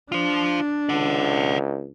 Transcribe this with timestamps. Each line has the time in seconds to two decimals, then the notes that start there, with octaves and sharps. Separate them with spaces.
0.12 D4 F4 C5
0.89 C#2 D5 F#5